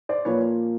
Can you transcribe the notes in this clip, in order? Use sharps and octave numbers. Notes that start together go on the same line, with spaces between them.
C5 D5
A#2 F3 A#3 B4 C#5